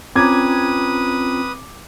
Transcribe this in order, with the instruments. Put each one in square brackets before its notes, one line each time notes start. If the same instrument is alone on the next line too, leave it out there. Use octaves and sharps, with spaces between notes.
[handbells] C4 [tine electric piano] C#4 F4 A#5 [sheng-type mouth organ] B4 D#6 [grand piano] D6 G#6